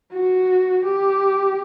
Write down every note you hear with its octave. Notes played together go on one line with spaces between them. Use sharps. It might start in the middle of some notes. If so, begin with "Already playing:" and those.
F#4
G4